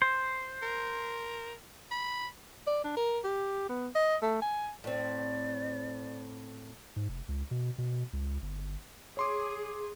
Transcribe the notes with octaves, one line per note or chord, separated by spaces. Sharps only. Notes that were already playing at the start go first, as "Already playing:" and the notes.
C5
A#4
B5
D5
D4
A#4
G4
B3
D#5
A3
G#5
A2 C4 D5
G#2
F1
C#2
B2
B2
C#2
G1
G#4 C#5 C6 D6